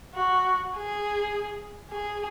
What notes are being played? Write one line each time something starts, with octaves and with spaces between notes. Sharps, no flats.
F#4
G#4
G#4